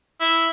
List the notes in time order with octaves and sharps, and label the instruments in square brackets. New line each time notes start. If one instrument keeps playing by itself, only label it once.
[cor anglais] E4